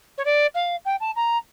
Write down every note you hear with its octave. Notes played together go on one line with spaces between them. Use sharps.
C#5
D5
F5
G5
A5
A#5